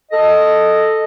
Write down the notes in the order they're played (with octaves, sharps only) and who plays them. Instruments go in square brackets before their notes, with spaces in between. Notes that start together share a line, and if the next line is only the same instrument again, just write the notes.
[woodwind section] A4 D#5